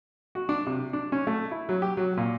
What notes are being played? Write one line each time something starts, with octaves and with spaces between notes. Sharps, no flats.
F#4
D4
C3
D4
C#4
A3
E4
F#3
G4
F#3
A#2